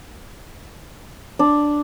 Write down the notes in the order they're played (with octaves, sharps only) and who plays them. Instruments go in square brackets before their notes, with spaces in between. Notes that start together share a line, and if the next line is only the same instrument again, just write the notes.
[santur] D4